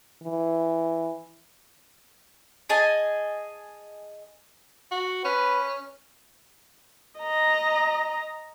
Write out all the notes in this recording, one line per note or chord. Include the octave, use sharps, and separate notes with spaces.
E3
G#4 D#5 G#5 A5
F#4
C#4 B4
D#5 A#5